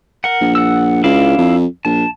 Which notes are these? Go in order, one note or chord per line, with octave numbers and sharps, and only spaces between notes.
A#4 F#5
A#1
F#5 E6
C#2 D4 E4 F5
F2
A#1 A5